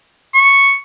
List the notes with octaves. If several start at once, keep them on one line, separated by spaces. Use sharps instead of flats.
C#6